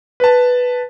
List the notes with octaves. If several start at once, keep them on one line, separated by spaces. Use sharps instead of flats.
B4 A5